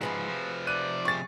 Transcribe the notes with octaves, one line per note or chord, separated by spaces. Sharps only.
G#2 F3 F#4 G#4 B4 E5
C3 F3
D5 F#6 D#7
G2 G#4 C#6 A6